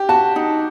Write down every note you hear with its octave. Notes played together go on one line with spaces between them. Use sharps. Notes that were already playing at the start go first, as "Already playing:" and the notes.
Already playing: G4
F#4 A5
D#4